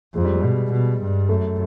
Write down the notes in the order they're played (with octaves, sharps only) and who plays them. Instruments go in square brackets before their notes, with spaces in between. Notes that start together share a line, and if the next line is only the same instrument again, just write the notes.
[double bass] F2 [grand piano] G#3
[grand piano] G3
G#3
[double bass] B2
B2
G2
[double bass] F#2 [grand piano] A3